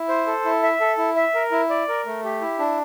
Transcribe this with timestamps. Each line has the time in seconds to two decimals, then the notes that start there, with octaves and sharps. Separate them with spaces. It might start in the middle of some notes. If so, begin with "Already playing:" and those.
Already playing: E4
0.08 C5
0.27 A4
0.45 E4
0.63 E5
0.81 A4
0.98 E4
1.16 E5
1.35 A#4
1.52 E4
1.70 D5
1.88 A#4
2.06 A3
2.24 G4
2.41 E4
2.59 D4